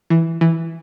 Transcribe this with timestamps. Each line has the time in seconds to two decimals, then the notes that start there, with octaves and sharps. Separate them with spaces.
0.10 E3
0.41 E3